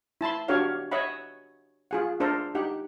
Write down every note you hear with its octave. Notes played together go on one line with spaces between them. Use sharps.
E4 A5 B5 C6
D4 F#4 G4 A#4 C#5 F5
C#5 D#5 E5 F#5 B5
F4 G#4 F#5
D4 A4 A#4 C5
D#4 G4 F#5